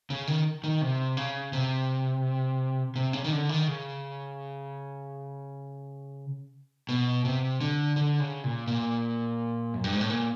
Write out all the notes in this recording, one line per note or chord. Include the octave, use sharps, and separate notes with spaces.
C#3
D#3
D#3
C3
C#3
C3
C3
C#3
D#3
D3
D#3
C#3
B2
C3
D3
D3
C#3
A#2
A#2
F#2
G2
G#2
A2
A#2